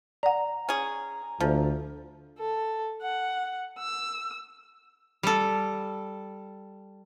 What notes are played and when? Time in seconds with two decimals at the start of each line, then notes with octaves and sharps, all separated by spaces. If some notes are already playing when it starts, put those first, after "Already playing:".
0.23 D5 F#5 A#5
0.69 C#4 G#4
1.41 D2 F3
2.39 A4
3.02 F#5
3.79 E6
5.23 G3 A4